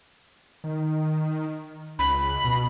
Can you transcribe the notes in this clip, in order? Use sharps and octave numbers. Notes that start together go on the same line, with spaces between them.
D#3
C#2 B5
B2